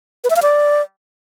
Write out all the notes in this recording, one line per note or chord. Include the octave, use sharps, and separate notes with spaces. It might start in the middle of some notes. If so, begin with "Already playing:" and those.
B4
E5
F5
D5